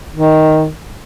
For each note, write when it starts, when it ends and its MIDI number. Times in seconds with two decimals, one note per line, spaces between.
0.13 0.69 51